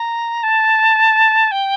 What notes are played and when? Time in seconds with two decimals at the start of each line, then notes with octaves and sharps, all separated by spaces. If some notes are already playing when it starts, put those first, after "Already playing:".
Already playing: A#5
0.43 A5
1.51 G5